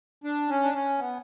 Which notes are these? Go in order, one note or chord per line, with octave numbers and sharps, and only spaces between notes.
D4
C#4
D4
C#4
B3